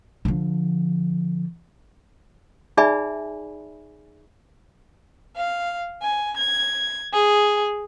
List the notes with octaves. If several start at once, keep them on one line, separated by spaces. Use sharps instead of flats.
D3 F3
D#4 G#4 D5 E5 G#5 B5
F5
G#5
G#6
G#4